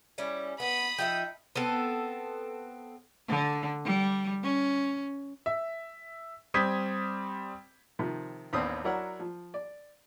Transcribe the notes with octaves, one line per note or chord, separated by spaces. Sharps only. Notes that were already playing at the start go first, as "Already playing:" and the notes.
G3 C#4 E4
B3 B5 D#6
F3 D#4 E5 G5
B3 C4 A4
D3
G3
C#4
E5
G3 C4 D#6 G6 G#6 B6
C3 D#3 F3
A1 D#2 B3 C4 D4 D#6
F#3 D4 E4 A#4 C#5 F#5
F3
D5